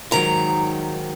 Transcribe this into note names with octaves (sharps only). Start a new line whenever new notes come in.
G#2 D#3 F#3 A#5